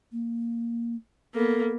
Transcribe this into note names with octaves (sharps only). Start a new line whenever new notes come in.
A#3
A#3 B3 A4